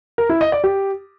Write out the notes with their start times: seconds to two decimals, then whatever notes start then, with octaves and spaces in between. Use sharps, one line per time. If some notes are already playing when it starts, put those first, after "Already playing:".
0.18 A#4
0.29 E4
0.41 D#5
0.52 D5
0.64 G4